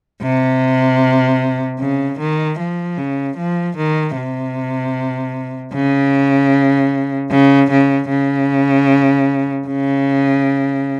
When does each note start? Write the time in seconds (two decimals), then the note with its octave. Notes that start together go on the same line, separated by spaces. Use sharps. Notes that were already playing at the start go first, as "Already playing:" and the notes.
0.22 C3
1.80 C#3
2.19 D#3
2.59 F3
2.98 C#3
3.37 F3
3.77 D#3
4.16 C3
5.74 C#3
7.31 C#3
7.70 C#3
8.09 C#3
9.67 C#3